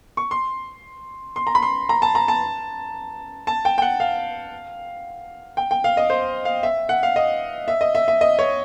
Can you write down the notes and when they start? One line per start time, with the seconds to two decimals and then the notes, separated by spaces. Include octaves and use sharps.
0.17 C#6
0.31 C6
1.36 C6
1.47 A#5
1.55 B5
1.62 C6
1.89 A#5
2.02 A5
2.15 A#5
2.28 A5
3.47 A5
3.65 G5
3.78 G5
3.82 F#5
4.00 F5
5.57 G5
5.71 G5
5.84 F5
5.97 D#5
6.10 C5
6.45 F5
6.63 E5
6.89 F#5
7.03 F5
7.16 D#5
7.68 E5
7.81 D#5
7.95 E5
8.08 E5
8.21 D#5
8.39 C#5